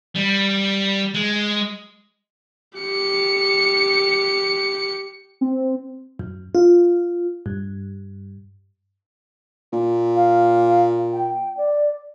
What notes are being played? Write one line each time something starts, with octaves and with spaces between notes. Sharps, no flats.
G3
G#3
G4 C#7
C4
F#2
F4
G2
A#2
F5
G5
D5